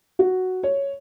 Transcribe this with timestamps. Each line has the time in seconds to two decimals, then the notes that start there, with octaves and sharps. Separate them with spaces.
0.19 F#4
0.63 C#5